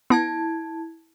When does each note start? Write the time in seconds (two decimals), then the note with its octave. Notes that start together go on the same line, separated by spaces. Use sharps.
0.10 B3 E4 A5 G#6